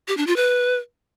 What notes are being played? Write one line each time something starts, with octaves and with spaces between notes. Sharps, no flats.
G4
D4
F4
B4